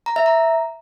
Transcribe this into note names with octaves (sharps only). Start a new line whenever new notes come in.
A#5
E5
A#5